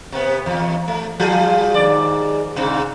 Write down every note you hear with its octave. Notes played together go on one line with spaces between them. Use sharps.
C3 B3
E2
A3
F3 F4 G#4
D#2 G#2 D5
G#2 C3